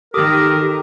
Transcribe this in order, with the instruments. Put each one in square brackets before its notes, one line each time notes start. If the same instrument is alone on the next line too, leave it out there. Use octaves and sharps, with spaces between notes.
[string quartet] D#3 [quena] G4 [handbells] A4 D6 D#6 [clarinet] A#4